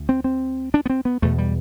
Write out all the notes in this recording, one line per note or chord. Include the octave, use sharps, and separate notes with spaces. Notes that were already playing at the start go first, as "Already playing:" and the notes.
Already playing: D2 D3
C4
C4
D4
B3
C4
B3
E2 B2 A3
G3